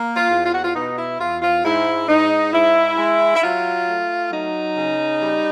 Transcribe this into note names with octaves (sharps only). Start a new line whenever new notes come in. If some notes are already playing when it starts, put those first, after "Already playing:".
Already playing: A#3
F4
E2
F4
F#4
F4
B2 D#4
E4
E2 F4
F4
G#2 E4
G#2 D#4
G#2 E4
G#3
E4
F#3 F4
A3
F#3 D#4
C#3
G3